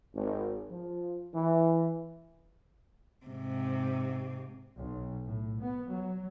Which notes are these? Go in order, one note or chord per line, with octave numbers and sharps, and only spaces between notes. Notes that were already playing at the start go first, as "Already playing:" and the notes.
G#1
F3
E3
G#2 C3
B1
A2
B3
F#3